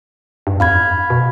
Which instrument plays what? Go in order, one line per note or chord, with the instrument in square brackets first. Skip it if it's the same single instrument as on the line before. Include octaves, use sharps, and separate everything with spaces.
[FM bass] G2
[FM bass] F2 [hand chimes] F5 B5 G#6
[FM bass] B2